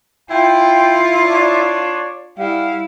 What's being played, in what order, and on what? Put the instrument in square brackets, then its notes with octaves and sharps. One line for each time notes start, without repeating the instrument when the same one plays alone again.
[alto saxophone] E4 [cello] F4 [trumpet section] G5
[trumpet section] D4 C#5 D5
[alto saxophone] G3 [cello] E4 [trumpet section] F5 F#5